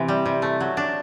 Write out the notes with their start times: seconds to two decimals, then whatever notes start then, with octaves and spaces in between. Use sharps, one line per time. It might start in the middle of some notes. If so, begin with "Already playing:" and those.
Already playing: C3 E3
0.08 G3
0.26 C3
0.42 A3
0.61 F#3
0.77 D4